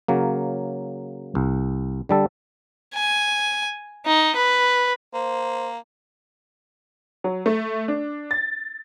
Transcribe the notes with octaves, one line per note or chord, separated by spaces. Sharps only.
C#3 F#3 A#3
C2
D3 G3 A4
G#5
D#4
B4
A#3 C5
F#3
A3
D4
A6